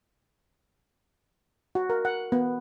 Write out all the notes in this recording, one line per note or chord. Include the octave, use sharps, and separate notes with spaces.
F#4
A#4
F#5
B3